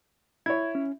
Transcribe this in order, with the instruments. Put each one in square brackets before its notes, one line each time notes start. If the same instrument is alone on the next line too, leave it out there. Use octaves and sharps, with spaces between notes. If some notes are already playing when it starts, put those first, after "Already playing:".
[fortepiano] E4 C#5 [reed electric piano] G#6
[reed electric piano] C#4